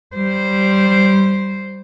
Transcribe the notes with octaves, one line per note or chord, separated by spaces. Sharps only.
G3 C5